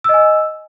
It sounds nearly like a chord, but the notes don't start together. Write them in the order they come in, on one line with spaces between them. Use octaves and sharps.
E6 D#5 G#5